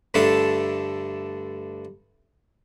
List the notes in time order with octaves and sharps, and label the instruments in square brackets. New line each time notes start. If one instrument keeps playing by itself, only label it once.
[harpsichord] G2 D3 A3 D4 A4 A5